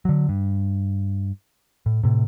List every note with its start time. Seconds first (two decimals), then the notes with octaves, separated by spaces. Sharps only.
0.05 D3 F#3
0.29 G2
1.86 A2
2.03 A2 C3